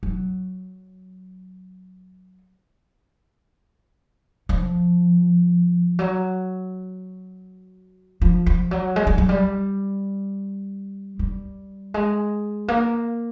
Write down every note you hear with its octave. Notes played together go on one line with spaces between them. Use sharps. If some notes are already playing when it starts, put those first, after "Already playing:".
F#3
F3
F#3
F3
F3
F#3
G#3
G3
F#3
G3
G3
G#3
A#3